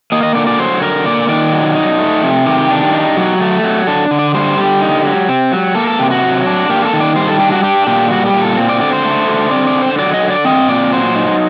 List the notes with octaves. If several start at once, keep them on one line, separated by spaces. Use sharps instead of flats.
A#3 D#5
D#5
D3 D5
D5
F#3 C5
D3 A#4
A#3 D5
D#3 D5
F#3
D#4
A3
C3
D#3 G4
D4
D#4
F#3
A3
F#3
D4 A4
D3
D5
G3 C5
D3 G4
D#4
F#3
C4
F#3
A#3 A4
A4
C3 G4
F#4
F#3
D4
A#3 G4
A4
D#3
D5
G3 C5
A4
D4 G4
F#4
D4 G4
A#2 G4
G3 F#4
G4
A#2
A4
C4
D5
D3 D5
C5
A3
D3
C4 D5
D5
D3
C5
F#3 D5
D#5
D3
D5
C4 D#5
A#2 D5
F#3 C5
D#4